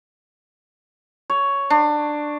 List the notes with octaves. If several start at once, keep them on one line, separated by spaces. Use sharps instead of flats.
C#5
D4